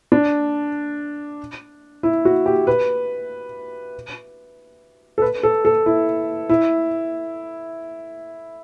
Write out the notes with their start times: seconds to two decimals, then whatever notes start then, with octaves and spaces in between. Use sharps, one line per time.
0.12 D4
2.03 E4
2.25 F#4
2.46 G4
2.67 B4
5.18 A4
5.22 B4
5.43 A4
5.65 A4
5.86 E4
6.49 E4